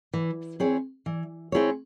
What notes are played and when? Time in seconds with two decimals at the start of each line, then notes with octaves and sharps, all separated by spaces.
0.13 E3
0.60 C4 E4 G#4 C#5
1.06 E3
1.52 C4 E4 G#4 C#5